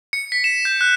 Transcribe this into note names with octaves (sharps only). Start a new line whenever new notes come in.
C#7
B6
E7
G6
F#6